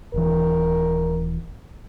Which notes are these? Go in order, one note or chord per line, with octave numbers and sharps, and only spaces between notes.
D#1 E3 A#4